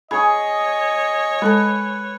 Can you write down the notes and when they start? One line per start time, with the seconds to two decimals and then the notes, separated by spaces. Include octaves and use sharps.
0.11 G#4 C#5 D#5 B5 C#6
1.42 G#3 A4 B4 A5